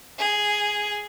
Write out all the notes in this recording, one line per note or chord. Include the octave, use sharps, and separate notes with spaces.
G#4